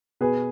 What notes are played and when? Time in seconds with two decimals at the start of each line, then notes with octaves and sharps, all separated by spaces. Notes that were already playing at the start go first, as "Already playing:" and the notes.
0.20 B2 G#4 B4